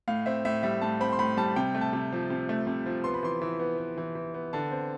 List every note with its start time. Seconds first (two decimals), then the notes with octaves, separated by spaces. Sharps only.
0.08 A2 F5
0.26 C4 E5
0.45 A2 E5
0.63 G3 E5
0.81 A2 A5
1.01 C4 B5
1.12 C6
1.19 A2 B5
1.37 G3 A5
1.56 C3 G5
1.75 A3
1.81 A5
1.93 C3
2.12 F3
2.30 C3
2.49 A3
2.67 C3
2.86 F3
3.04 B3 C6
3.14 B5
3.23 E3 C6
3.42 E3
3.60 B3
3.78 B3
3.98 E3
4.15 E3
4.34 B3
4.53 D3 A5
4.72 C4